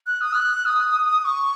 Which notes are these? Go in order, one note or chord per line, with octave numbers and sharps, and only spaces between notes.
F#6
D#6
F#6
D#6
C#6